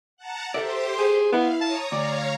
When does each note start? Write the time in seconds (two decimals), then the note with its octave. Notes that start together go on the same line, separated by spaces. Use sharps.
0.17 F#5 A5 A#5
0.54 G4 A4 A#4 C5 D5 E5 C6
0.99 G#4
1.32 B3 E4 B4 F5
1.61 C#5 A5 A#5 D#6
1.92 D2 C#5 D5 F5 A#5